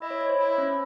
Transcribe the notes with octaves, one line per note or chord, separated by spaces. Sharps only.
E4 D#5
C#5
C#5
C5
E4
C#4